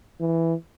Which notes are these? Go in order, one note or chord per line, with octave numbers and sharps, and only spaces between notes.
E3